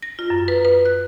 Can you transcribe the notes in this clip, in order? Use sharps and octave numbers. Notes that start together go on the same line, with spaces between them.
A#6
F4
F#2
B4
B4
F#6